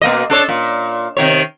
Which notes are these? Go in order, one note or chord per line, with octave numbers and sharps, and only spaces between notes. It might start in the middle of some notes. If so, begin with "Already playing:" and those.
B2 A#3 D#5
D4 A4 C#5
A#2
C3 D#3 C#5